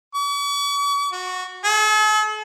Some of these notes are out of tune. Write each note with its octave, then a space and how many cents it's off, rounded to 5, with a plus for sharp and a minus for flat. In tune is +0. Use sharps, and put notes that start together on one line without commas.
C#6 +45
F#4 -15
A4 -45